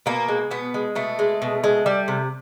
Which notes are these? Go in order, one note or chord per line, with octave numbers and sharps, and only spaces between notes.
B2 A#3
G#3
B2 B3
G#3
B2 A3
G#3
B2
G#3
G3
C3